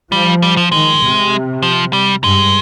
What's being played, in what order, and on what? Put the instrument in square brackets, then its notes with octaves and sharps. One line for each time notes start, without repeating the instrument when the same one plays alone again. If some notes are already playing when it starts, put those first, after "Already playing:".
[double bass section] F3 [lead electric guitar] G3
[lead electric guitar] G3
F3
[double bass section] D#3 [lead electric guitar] G#3
[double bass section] C3
[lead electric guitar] F3
G3
[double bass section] G2 [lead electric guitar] G#3